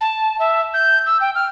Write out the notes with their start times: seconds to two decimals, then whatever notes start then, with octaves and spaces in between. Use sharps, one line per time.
0.01 A5
0.39 E5
0.74 G6
1.06 E6
1.21 G5
1.35 F6